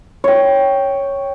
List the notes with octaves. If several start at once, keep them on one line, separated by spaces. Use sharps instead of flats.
C#5 G5